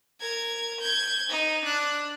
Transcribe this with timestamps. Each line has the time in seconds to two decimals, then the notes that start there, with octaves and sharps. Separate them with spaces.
0.20 A#4 G#6
0.80 G6 G#6
1.30 D#4
1.64 D4 F#6